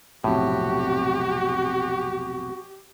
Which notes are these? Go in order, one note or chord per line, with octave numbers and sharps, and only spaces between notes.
B1 F2 A2 C3 F#4 G4